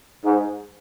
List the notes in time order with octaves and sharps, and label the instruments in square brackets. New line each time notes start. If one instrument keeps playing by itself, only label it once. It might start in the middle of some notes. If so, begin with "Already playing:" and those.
[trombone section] G#2